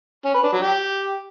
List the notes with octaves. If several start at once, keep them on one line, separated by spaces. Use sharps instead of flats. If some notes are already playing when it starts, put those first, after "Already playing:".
C#4
B4
D4
F#3
G4